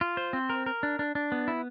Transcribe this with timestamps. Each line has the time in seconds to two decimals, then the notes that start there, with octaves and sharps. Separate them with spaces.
0.01 F4
0.17 C5
0.33 C4
0.50 A#4
0.66 A#4
0.83 D4
0.99 D4
1.15 D4
1.32 B3
1.48 E4